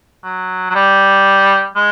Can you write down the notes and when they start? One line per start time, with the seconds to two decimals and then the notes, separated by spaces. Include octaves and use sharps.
0.24 F#3
0.70 F#3
0.75 G3
1.76 G#3